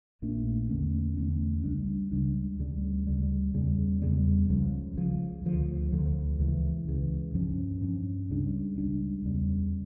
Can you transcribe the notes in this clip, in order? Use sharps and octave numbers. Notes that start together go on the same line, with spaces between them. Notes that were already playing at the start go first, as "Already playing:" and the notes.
A#1 A#2 A3 D4
E2 D3 A3 C#4
E2 D3 A3 C#4
C#2 C#3 G3 D4
C#2 C#3 G3 D4
D2 C#3 G3
D2 C#3 G3
E2 C#3 G3
E2 C#3 G3
C#2 C#3 F3
C#2 C#3 F3
D2 D3 F3
D2 D3 F3
C#2 C#3 E3
C#2 C#3 E3
G2 F3 C#4
G2 F3 C#4
C#2 C#3 G3 D4
C#2 C#3 G3 D4
E2 C#3 G3